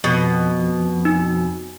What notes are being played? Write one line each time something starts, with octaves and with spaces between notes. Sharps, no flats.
F2 B2
D#4